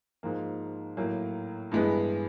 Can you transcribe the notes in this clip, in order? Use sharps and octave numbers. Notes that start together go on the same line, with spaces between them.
G#2 F3 A#3
A2 F#3 A#3
G2 E3 G#3 B3